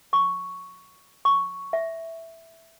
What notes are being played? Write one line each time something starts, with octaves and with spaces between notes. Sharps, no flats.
C#6
C#6
E5